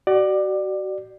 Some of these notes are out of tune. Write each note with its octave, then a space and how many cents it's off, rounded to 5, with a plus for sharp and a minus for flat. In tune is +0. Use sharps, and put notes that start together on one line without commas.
F#4 +35 D5 +20